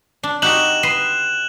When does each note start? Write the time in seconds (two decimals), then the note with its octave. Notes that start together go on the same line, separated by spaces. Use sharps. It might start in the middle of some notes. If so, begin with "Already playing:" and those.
0.23 D4
0.42 D#4 F#4 G4 F#6 E7 F#7
0.83 B4 D#5 C6